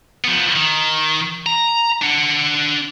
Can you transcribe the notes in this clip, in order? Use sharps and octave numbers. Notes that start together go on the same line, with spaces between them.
F3 B3
D#3
A#5
D4 F#5